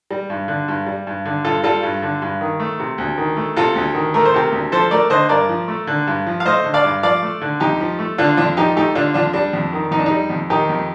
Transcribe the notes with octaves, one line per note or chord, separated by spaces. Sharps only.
G3
G2
D3
G2
G3
G2
D3
G2 F4 A4
G3 F4 A4
G2
D3
G2
D#3
A3
C3
D2
D#3
A3
C3 F4 A4
D2
D#3
A3 A#4
C5
C3 G4 A#4
D2
F3 A4 C5
A3 A#4 D5
D3 C5 D#5
G2 A#4 D5
F3
A3
D3
G2
F3
F5
A3 C5 D#5
D3
D5 F5
G2
F3 D5 F5
A3
D3
F2 D#4 G4
F3
A3
D3 D4 F4
F2 D4 F4
F3 D#4 G4
A3 D#4 G4
D3 D4 F4
F2 D4 F4
G3 D4
F2
D#3
F2 D#4
D4
G3 D#4
F2
D#3 D#4 G4
F2